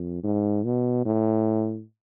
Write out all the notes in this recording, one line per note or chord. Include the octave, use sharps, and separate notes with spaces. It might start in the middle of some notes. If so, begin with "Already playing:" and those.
Already playing: F2
G#2
B2
A2